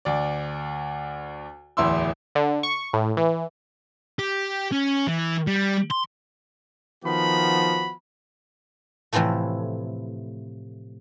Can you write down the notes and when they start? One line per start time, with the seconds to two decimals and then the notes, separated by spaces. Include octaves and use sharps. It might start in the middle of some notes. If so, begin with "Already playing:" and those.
0.05 D2 D5
1.77 D1 E2 E4 C6 E6
2.35 D3
2.63 C#6
2.93 A2
3.17 E3
4.19 G4
4.72 C#4
5.07 E3
5.47 G3
5.91 C6
7.05 D#3 F3 B3 F#4 B5
9.13 A2 C3 E3 F3 A3